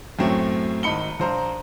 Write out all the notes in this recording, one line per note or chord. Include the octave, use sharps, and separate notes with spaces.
F#2 A2 F#3 A3 C4 C#4
G#1 D#4 B5 C#7 G7
A#1 C5 A#5